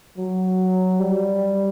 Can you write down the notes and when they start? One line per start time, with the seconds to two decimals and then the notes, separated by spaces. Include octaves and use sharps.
0.18 F#3
1.00 G3